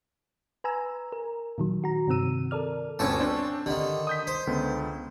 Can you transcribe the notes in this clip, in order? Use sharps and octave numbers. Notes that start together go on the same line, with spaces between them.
B4 G#5 A#5 E6
A#4
A#2 D#3 F#3
F#4 A#5
G2 C3 D#3 C4 E6 D#7
A4 A#4 D5 F6
G1 D2 C4 C#4 A4 A5
C4 D4 C5
D3 D#3 G4
D#6 G6 B6
C5
C#2 D3 B3